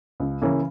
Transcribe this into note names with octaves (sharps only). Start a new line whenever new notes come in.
C#2
C#3 E3 A#3 C#4